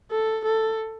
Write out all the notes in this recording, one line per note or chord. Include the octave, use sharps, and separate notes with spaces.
A4
A4